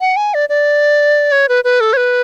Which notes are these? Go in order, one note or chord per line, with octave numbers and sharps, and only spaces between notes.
F#5
G#5
D5
D5
C#5
B4
B4
A4
C#5
B4